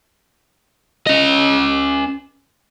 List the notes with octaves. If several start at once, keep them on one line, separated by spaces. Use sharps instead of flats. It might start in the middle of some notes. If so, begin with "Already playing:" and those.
C#4 D#5